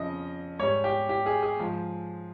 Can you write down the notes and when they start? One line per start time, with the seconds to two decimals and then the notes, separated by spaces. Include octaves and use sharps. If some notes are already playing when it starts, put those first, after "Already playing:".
Already playing: F2 C#3 F3 D#5
0.59 G#2 C#5
0.62 G3
0.84 G4
1.09 G4
1.26 G#4
1.43 G#4
1.59 G#2 F3 G#3